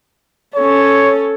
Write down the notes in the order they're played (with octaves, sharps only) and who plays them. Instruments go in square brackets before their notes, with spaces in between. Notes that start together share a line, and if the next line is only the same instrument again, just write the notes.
[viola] C#4 A4 [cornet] C#5